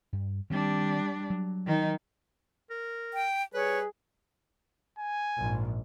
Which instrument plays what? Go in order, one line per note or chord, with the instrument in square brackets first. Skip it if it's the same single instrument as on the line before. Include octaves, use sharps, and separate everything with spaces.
[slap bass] G2
[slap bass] D#3 C4 [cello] G3 D4
[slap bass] F#3
[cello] D#3 D#4
[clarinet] A#4
[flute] G5
[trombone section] G3 G#4 [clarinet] B4 [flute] C#5
[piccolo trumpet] G#5
[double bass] A#1 G#2